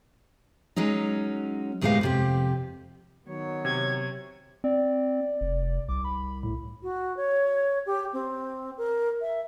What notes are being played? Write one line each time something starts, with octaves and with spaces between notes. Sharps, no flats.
F#3 G#3 C#4 D#4
D2 A2 G3 G#3 B3 F5
F2 C3 G4
D#3 F#3 B3 C#5
C3 G#6
C4 D5
F1
C2 D6
B5
A2
F#4
C#5
G4
C4
A#4
E5